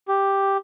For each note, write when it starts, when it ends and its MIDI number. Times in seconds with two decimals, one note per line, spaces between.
0.08 0.57 67